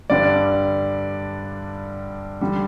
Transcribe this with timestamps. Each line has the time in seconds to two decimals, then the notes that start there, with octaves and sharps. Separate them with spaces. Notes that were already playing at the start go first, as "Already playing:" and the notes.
0.10 G2 D3 G3 D5
2.41 D3 G3